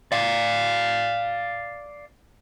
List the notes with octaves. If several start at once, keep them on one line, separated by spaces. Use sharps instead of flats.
D5 F5